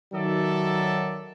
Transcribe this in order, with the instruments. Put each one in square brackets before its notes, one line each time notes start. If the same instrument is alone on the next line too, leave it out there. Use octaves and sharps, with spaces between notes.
[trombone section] D#3 F#3 [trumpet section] A4 D5 E5